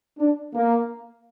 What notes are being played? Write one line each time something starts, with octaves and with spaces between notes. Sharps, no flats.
D4
A#3